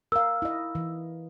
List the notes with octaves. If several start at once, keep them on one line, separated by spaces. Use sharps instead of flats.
A#4 F5 E6
E4 D#5
E3